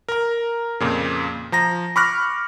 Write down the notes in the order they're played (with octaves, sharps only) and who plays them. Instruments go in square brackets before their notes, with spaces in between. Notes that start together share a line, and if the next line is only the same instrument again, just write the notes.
[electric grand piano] A#4 A#5
F2 A#2 C#3
F3 A#5 A#6
B5 C#6 D6 F6 F#6 A#6